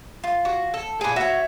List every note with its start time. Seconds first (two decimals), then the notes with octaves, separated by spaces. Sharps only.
0.24 F4
0.45 F#4
0.74 A4
1.01 A#2 G#4 B4 G#5
1.16 F#4 C#5 E5